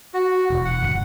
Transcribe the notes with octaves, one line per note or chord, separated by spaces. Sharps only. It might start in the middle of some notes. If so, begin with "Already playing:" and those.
F#4
E1
F#5
G1